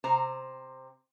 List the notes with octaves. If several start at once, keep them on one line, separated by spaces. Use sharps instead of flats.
C3 C5 A#5